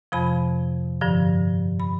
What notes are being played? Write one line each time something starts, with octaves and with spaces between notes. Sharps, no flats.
F2 C3 F3 B5
G2 D3 F3
B5